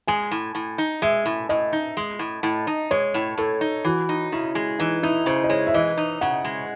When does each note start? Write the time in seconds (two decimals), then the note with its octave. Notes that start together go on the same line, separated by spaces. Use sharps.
0.08 G#3 G#5
0.31 A2
0.55 A2
0.78 D#4
1.02 G#3 E5
1.26 A2
1.49 A2 D#5
1.73 D#4
1.97 G#3
2.19 A2
2.43 A2
2.67 D#4
2.91 G#3 C#5
3.14 A2
3.38 A2 A4
3.61 D#4
3.84 E3 F#4
4.09 D#4
4.32 C#3 E4
4.55 G#3
4.79 E3 D#4
5.03 D#4 E4
5.26 C#3 C5
5.44 D#5
5.50 G#3 C#5
5.67 E5
5.74 E3 D#5
5.98 D#4
6.21 C#3 F#5
6.45 G#3